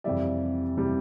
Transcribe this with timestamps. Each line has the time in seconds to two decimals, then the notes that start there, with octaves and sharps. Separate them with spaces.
0.04 F2 C3 E3 G3 D5 E5
0.77 C3 E3 G3